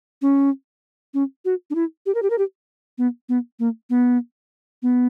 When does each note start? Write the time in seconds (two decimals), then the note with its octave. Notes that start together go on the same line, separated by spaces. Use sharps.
0.22 C#4
1.14 C#4
1.45 F#4
1.70 D4
1.75 E4
2.06 G4
2.15 A#4
2.23 G4
2.30 A#4
2.38 G4
2.98 B3
3.29 B3
3.59 A#3
3.90 B3
4.82 B3